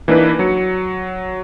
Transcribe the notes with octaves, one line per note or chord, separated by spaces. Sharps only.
E3 A#3 D4 D#4 B4
F#3 C#7